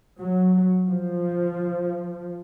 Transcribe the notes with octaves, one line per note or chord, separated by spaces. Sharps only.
F#3
F3